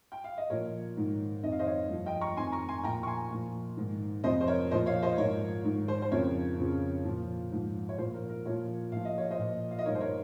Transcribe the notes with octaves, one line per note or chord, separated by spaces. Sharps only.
G5
F5
D#5
A#2 F3 A#4 C#5
G#2 D#3
F2 D#3 D#5
F5
C5 D#5
C#5 F5
G2 F3
D#5 G5
A#5 C#6
F2 D#3 G#5 C6
A#5 C#6
G#5 C6
A#2 F3 G5 A#5
C#6
G#5 C6
A#2 F3
G#2 D#3
F2 C3 F3 C5 D#5
C5
A#4 C#5
A#2 F3 C5 D#5
C#5 F5
C5 D#5
G#2 F3 A#4 C#5
G#2 D#3
C5
C5
F2 C#3 F3 A#4 C#5
F2 C#3 F3
A#2 F3
G#2 F3
C#5
A#2 F3 C5
A#4
A#4
A#2 F3 A#4 C#5
A#2 F3 F5
D#5
C#5
C5 D#5
A#2 F3
F5
D#5
G2 D#3 A#4 C#5
C5
A#4 C#5